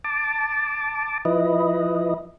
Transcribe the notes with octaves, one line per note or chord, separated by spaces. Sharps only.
A5 D6
F3 E4 B4 D#5